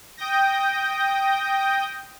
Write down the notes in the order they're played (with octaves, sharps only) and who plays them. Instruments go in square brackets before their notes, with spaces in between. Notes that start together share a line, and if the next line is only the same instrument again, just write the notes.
[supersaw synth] G5 D#6 G6 A#6